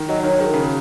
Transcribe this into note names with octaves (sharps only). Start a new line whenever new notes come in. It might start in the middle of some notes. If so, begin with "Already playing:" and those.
Already playing: D#3
F#3 D#5
D#3 C#5
D#3 G#4
A#4
C#3